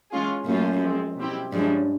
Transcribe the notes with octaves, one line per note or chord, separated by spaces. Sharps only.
E3 G#3 C#4 F4 G#4
F#2 A#2 F#3 A3 C#4 F4
F3 G#3 C4
B2 G3 C4 E4 G4
G2 F3 G#3 C#4 E4